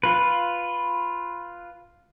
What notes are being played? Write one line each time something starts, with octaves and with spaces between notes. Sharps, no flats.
F4 B4